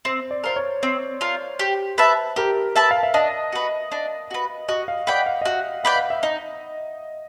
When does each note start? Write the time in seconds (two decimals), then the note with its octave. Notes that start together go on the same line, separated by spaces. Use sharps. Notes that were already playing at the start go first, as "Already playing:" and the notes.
0.05 C4 C5
0.31 D5
0.44 F4 A#4 C5
0.56 C#5
0.83 C4 C5
1.21 F4 A#4
1.59 G4
1.98 B4 E5 A5
2.36 G4 A#4
2.76 B4 E5 A5
2.91 F5
3.03 E5
3.14 D4 D#5
3.52 F#4 B4
3.92 D4
4.31 F#4 B4
4.69 F#4 D#5
4.88 F5
5.07 B4 D5 F#5 G5
5.26 F5
5.41 D#5
5.46 F#4 E5
5.84 B4 D5 F#5 G5
5.96 F5
6.10 E5
6.23 D#4 D#5